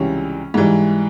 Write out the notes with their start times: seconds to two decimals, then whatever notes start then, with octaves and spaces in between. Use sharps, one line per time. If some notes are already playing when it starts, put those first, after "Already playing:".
Already playing: C#2 C3 E3 G3 C#4
0.54 G#2 E3 G3